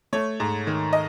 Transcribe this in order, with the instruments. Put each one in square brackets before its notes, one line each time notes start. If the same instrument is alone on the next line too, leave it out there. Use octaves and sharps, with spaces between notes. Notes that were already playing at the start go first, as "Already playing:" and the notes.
[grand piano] A3 C#5
G#2
D#3
D#5